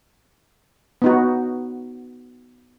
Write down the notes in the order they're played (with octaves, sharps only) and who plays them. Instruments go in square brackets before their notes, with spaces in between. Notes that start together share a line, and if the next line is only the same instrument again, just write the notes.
[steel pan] B3 D#4 F#4